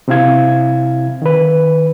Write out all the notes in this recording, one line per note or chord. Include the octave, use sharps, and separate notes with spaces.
C3 C4 E4 F5 G#6
D#3 B4